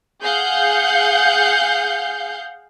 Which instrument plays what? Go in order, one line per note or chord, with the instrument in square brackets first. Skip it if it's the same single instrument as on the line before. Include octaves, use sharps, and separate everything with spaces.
[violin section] G#4 F5 F#5 G6